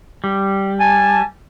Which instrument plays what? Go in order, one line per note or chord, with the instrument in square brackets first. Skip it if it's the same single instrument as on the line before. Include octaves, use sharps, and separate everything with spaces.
[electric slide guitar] G3
[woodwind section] G#5 A5